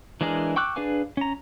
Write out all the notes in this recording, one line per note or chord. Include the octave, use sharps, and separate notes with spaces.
E3 G#3 D4 G#4 A#4
G5 C#6 D6 E6 F#6
D4 G#4 B4 F5 G#5
C#4 A#5